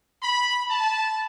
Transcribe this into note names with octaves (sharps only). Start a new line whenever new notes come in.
B5
A5